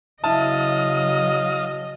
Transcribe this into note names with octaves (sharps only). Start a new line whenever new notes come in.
C#3 F#3 E4 D#5 F5 A5 D#6